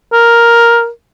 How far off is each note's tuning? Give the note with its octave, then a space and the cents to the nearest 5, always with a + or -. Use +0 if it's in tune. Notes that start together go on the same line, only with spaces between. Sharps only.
A#4 +5